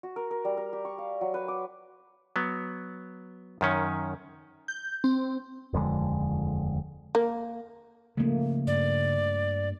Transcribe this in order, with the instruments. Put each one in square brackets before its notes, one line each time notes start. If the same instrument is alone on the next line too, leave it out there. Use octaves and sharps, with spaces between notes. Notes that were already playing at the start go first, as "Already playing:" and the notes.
[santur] F#4
A#4
A#4
G3
A#4
G4
C#6
F5
F#3
B4
D6
[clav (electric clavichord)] F#3 B3
F#2 D#3 C#4
[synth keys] G6
C4
[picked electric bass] D#1 F2 D3 G#3
[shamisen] A#3
[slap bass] C#3 F3 [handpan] A3 A#3
[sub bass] G2 [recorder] D5